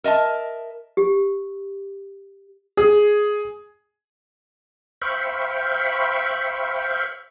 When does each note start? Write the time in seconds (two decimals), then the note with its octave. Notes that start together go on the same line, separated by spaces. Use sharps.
0.04 A#4 D#5 E5 A5
0.97 G4
2.77 G#4
5.02 C5 E5 F5 G5 B5 C#6